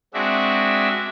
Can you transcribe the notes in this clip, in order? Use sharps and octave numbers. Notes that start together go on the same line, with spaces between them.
G#3 C4 D4 F#4 E5